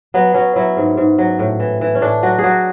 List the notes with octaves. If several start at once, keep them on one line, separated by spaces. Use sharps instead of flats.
F#3 B3
F#3 C#4
F#3 E4
G#2
G#2
F#3
A2
E3
E3
C#4
A2 D4
F#3 F#4
G#4
F#3 F#4